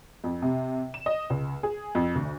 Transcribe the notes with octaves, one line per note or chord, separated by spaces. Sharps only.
F2
C3
E7
D#5
C#2
G#4
F2
D2